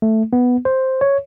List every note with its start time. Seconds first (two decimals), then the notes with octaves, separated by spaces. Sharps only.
0.02 A3
0.33 B3
0.65 C5
1.01 C#5